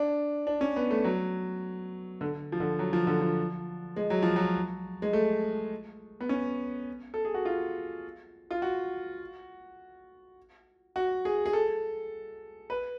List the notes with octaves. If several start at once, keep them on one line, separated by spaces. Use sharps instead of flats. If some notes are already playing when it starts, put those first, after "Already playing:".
Already playing: D4
D4
C#4
B3
A3
F#3
D3
F3
D3
F#3
F3
D3
F3
G#3
F#3
F3
F#3
G#3
A3
B3
C#4
A4
G#4
F#4
F4
F4
F#4
F#4
G#4
G#4
A4
B4